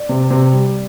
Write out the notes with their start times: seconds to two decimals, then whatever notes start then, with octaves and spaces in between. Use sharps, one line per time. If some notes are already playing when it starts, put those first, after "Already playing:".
Already playing: D5
0.09 C3
0.31 C3
0.53 G3